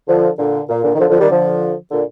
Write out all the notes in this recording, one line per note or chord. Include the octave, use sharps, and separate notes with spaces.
D3 F3
A#2 D3
A#2
A#2 D3
D#3
D3 F3
D3 F3
D#3 G3
D3 F3
A#2 D3